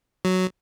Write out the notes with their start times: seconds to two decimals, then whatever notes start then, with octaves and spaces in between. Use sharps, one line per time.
0.25 F#3